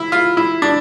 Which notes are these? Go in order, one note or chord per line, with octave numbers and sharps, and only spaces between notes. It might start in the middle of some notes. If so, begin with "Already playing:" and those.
Already playing: E4
F4
E4
D4